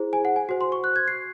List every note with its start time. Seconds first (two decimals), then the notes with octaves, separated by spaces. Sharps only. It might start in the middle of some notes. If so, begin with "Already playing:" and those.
Already playing: E4 G#4 C5
0.13 G#5
0.25 F#5
0.36 G#5
0.49 F#4 C5
0.61 C6
0.72 C#6
0.84 F#6
0.96 G#6
1.08 C7